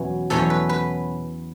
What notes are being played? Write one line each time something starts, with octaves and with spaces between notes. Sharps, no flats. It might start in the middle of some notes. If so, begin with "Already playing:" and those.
Already playing: E2 B2 F#3 C#4
E2 B2 F#3 C#4 A4
B4
B4